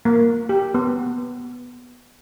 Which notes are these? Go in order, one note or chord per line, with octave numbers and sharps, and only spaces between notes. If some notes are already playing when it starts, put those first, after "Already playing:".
A#3
G4
B3